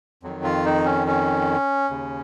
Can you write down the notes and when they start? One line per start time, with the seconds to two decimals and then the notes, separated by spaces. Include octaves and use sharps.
0.23 F2 D#3 F#3
0.44 F4
0.65 D#4
0.85 C#4
1.07 C#4
1.90 D#2 C#3